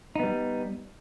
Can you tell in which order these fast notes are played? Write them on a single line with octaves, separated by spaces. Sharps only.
D#4 B3 G3